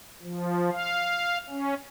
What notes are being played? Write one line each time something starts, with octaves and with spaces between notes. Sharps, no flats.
F3
F5
C#4